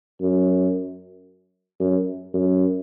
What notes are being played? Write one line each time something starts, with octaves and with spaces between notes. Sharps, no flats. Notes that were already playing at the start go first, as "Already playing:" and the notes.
F#2
F#2
F#2